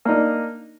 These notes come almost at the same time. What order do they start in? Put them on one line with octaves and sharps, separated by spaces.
A#3 D#4 D4